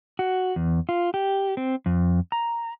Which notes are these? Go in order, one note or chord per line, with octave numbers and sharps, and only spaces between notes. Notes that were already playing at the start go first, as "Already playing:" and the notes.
F#4
E2
F4
G4
C4
F2
A#5